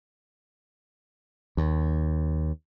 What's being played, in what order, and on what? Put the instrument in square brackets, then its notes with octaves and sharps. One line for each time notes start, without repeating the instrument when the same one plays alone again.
[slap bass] D#2